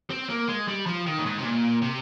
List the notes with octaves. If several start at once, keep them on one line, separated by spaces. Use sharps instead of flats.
C4
A#3
G#3
G3
F3
D#3
A#2
G#2
C3
A#2
C3